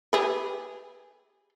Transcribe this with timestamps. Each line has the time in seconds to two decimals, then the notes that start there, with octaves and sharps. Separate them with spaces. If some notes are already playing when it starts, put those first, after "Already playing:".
0.13 G4 G#4 B4